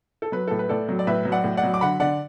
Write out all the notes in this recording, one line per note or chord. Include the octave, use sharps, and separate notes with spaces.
A4
F#3 B4
A2 A4
B4
A2 A4 D5
F#3
D5
A2 B4 E5
F#3
D5 F#5
A2
D5 F#5
F#3
D6
D3 F#5 B5
D3 D5 F#5